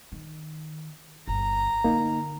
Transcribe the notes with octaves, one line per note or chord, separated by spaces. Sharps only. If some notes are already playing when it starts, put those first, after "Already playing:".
D#3
G1 A#5
D3 A3 A#3 D#4